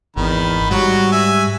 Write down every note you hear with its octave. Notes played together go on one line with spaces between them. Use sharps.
G#1 E2 D#3 B5
G#2 F#3 G3 F#4
E5 G#5